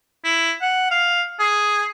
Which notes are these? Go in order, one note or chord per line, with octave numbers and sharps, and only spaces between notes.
E4
F#5
F5
G#4